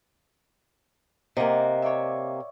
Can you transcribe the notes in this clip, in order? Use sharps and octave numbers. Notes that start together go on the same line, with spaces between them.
C3 A#3 D#5 F#5 G5
C#5 D5 E5